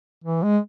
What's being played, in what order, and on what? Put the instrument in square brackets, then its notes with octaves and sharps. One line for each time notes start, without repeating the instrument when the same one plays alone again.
[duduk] E3
G#3